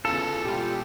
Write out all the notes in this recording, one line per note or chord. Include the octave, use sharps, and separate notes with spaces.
E2 C#3 F4 A4 B4
B2 G3 G#3 F4 G4